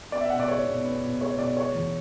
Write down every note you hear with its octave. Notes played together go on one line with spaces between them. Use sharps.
B3 D5
E5
B2 F#5
D5
G#3 C#5
B2
B3
B2
G#3 C#5
B2 D5
G#3 C#5
E2